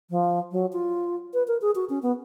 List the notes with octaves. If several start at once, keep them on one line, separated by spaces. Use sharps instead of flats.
F3
F#3
F4
B4
A#4
G#4
F#4
C#4
B3